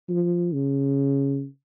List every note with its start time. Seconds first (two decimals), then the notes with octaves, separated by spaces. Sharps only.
0.09 F3
0.54 C#3